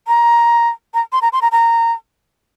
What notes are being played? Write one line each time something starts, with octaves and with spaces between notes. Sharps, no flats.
A#5
A#5
C6
A#5
C6
A#5
A#5